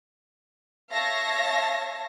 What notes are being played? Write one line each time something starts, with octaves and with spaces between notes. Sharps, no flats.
C#5 E5 F5 A5 A#6